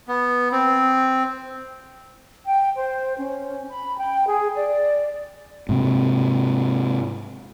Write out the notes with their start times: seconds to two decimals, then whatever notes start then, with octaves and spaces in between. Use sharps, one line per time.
0.08 B3
0.52 C4
2.47 G5
2.76 C5
3.18 C#4
3.69 B5
3.98 G5
4.27 G#4
4.54 D5
5.69 G#2 C3